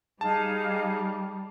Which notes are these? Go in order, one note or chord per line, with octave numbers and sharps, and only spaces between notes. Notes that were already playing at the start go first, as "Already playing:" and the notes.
G3 D#4 G#4 F5 A5